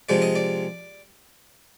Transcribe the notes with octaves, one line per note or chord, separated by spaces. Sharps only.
C3 F3 G#3 D5
D#5
D5